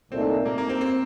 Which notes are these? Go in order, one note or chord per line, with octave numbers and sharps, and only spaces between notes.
C2 A#2 A3 C4 D#4
A#3
A#3
C4
C4